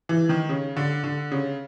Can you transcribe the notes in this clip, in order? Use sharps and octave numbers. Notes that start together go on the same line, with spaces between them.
E3
D#3
C#3
D3
D3
C#3